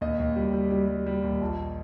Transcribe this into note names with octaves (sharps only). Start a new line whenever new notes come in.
D#2 D#5
D#2
G3
G3
G3
G3
G3
D#2
A#1